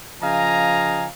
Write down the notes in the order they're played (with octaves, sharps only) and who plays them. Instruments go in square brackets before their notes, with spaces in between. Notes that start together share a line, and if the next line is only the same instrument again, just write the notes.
[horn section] C#3 F3 D#5 F5 G#5 A#5